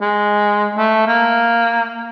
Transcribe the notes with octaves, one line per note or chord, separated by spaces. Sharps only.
G#3
A3
A#3